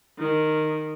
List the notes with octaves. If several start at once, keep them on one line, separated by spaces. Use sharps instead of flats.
D#3